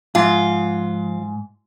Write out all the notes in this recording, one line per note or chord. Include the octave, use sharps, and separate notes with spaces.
G#2 F3 F4